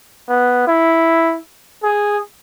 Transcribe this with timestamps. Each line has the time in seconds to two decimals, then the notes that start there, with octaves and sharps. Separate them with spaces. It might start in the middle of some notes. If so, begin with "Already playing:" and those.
0.29 B3
0.67 E4
1.83 G#4